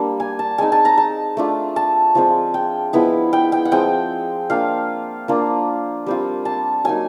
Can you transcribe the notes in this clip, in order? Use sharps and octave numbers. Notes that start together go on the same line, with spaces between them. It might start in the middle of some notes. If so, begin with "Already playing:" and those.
Already playing: G3 A#3 D4
G#5
A5
G#3 C4 D#4 G#5
A5
A#5
A5
A3 D4 F4
A5
F3 G#3 C4 F4
G5
F3 G#3 B3 E4
G5
G5
F#5
F3 G#3 C4 G5
A#3 D4 F4 F5
A#3 D4 F4
G3 C4 F4
A5
F#3 A#3 D#4 G#5